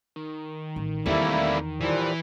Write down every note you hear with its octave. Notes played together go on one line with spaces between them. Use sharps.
D#3
A1
E2 G3 A3 A#3 C4 E4
A#2 E3 F3 G3